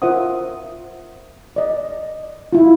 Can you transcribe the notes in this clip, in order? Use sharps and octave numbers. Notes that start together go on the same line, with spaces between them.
F4 A#4 C5 E5 F#5 D#6
D5 D#5
E4 F4